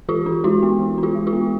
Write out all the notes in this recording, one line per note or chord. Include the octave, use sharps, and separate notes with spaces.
E3 F4 G4
D4
G#3 E4 F#4
B3
E3
D4
F4 G4
G#3
F4 G4
B3